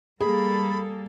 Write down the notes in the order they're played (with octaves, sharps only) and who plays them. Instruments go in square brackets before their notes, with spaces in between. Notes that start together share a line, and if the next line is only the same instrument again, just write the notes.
[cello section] G3 A#3 A4 [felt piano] G#4 [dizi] B5